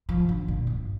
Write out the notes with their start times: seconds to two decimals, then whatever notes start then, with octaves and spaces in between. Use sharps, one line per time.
0.09 F3
0.29 D3
0.48 A#2
0.67 G2